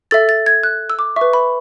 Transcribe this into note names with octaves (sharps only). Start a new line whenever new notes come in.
A4 E5 A6
A6
G#6
F#6
E6
D6
E5 C#6
B4
B5